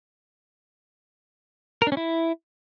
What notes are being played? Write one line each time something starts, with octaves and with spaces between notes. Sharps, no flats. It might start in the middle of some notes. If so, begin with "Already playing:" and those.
A#4
D4
C#4
E4